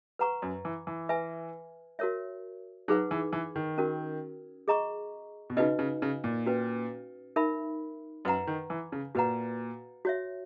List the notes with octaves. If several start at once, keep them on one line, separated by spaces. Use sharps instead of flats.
B4 F#5 A#5 C#6
F#2
E3
E3
B4 E5 G#5
F#4 A#4 C#5 E5
F#3 D#4 G#4 B4 F#5
E3
E3
D#3
C#4 F#4 A#4
G#4 D#5 A#5 C#6
B2
C#3 D#4 F#4 B4 D#5
C#3
C#3
A#2
C#4 F#4 B4
D#4 A#4 E5 B5
F#2 B4 F#5 A#5
D#3
E3
C#3
A#2 F#4 B4 F#5 A#5
F#4 C#5 E5